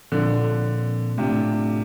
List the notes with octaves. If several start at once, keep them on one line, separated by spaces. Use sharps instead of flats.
A#2 D3 F3 C4 F4
A2 C3 A3 D4 F4